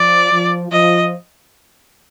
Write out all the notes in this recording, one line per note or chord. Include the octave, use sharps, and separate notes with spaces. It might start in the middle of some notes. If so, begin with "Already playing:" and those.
Already playing: F3 D5
F3
F3 D#5